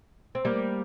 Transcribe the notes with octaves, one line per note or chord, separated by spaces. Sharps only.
C4
G3 A#3